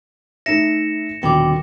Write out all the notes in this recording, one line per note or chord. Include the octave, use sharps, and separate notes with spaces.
A3 D#4 E5 A#6 C#7 E7
D#1 B2 D3 G5 D6